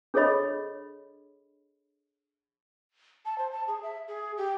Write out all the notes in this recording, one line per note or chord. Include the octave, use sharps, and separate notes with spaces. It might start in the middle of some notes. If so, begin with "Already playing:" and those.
D4 G#4 A4 C#5 D#5 B5
A5
C5
A5
G#4
E5
G#4
G4